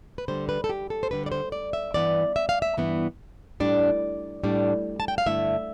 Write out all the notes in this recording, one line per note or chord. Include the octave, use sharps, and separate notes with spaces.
B4
D2 D3 G3 C5
B4
A4
G4
A4
C5
D2 D3 G3 B4
D5
C5
D5
E5
G2 E3 B3 D5
E5
F5
E5
G2 E3 B3
A2 G3 D4 D5
A2 G3 D4
A5
G5
F5
G2 D3 A3 E4 E5